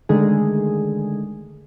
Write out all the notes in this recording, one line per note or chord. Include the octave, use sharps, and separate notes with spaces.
D3 D#3 G#3 A3 G#4